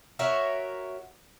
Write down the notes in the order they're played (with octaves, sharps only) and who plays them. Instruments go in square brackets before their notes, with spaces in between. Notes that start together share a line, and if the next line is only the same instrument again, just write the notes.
[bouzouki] F#4 A#4 C#5 E5